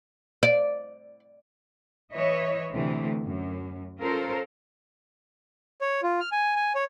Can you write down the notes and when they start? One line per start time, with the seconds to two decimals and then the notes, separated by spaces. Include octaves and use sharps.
0.43 D5
2.13 E3 B4 C#5 D#5 E5
2.71 D2 C3 E3 A3 C4
3.25 F#2
3.99 C#4 F4 A4 A#4 C5
5.81 C#5
6.03 F4
6.20 F6
6.32 G#5
6.56 G#5
6.75 C#5